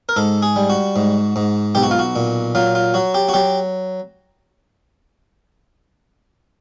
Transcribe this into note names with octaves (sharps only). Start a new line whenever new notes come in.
A#4
G#2 A4
G#4
G3
F#4
G#2
G#2
B1 G4
F#4
F4
F#4
A#2
F#3 F4
F4
F#3 F#4
G4
F#4
F#3 G4